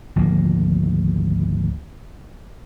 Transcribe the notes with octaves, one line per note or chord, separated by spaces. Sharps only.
G#1 D2 F3 A#3